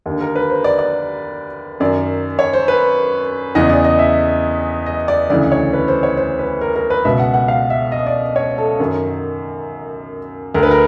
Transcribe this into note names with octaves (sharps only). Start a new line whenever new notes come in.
D#2 D3
A#4
B4
C5
D5
D5
F#2 D#3 D5
C#5
C5
B4
E2 C#3 E3 D#5
D5
D#5
E5
D#5
D5
D2 C#3 E3 D5
C#5
B4
C5
C#5
C5
B4
A#4
A#4
B4
C#2 B2 E5
F#5
F#5
F5
E5
D#5
D5
C#5
A4
F#2 D#3
D2 D3 A#4
B4
A#4